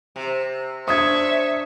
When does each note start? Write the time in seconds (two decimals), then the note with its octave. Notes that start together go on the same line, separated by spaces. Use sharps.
0.16 C3
0.88 D4 C5 C#5 E5 C#6 D#6 G#6